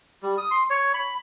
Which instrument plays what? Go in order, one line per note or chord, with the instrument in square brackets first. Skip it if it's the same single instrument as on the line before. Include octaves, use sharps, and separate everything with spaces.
[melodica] G3
D#6
C6
C#5
B5